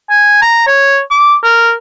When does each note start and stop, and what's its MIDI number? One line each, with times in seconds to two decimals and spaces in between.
0.10 0.40 80
0.42 0.65 82
0.67 1.00 73
1.11 1.35 86
1.44 1.73 70